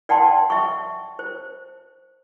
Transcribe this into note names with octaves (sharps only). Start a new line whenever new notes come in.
D5 F#5 G5 A5 C6
E5 C#6
C5